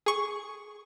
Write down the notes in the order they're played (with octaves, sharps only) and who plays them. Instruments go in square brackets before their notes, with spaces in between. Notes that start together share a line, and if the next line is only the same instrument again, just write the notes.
[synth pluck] G#4 C#6